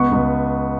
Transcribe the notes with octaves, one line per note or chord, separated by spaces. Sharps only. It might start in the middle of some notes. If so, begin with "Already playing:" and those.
Already playing: C#2 B3 C#6
C#2